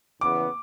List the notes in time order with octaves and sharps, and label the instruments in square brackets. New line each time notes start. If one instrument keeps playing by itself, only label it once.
[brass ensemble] E2 C#3 E3 B3 [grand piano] D6